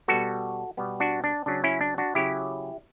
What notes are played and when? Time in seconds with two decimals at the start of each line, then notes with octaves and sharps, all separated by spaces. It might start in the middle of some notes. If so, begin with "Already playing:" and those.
0.08 B2 G3 B3 F#4 A4
0.77 B2 G3 B3
1.00 D4 F#4
1.24 D4
1.46 C#3 F#3 C#4 D4
1.64 C#4 E4
1.81 D4
1.98 D4 F#4
2.15 C#3 F#3 C#4 E4 G4